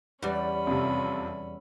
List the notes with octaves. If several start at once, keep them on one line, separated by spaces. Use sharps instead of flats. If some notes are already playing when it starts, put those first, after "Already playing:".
E2 G3 C#4 B5
F2 C3